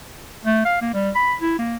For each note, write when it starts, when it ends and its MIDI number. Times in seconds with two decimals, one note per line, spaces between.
0.45 0.63 57
0.65 0.81 77
0.81 0.90 58
0.94 1.10 55
1.15 1.35 83
1.41 1.56 64
1.59 1.76 58